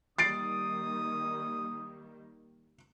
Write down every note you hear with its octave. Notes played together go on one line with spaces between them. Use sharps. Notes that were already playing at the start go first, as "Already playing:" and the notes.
D#3 G3 A#3 D#6 A6 C7 D7